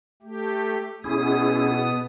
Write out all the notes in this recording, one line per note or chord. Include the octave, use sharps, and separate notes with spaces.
A3 G4
B2 B3 C#4 E4 G#4 D#6